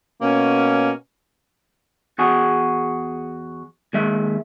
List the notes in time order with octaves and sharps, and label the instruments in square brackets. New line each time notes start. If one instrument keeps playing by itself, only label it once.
[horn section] B2 A#3 C#4
[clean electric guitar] E2 F#4 G#4
D#2 G#3 E5